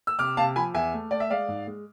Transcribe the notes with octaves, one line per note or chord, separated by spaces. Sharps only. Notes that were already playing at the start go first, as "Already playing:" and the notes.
E6
C3 D6 F6
C3 F5 A5
F3 G#5 B5
E2 E5 G#5
A3
A3 D5
E5
G#3 D5 F5
G#2
G#3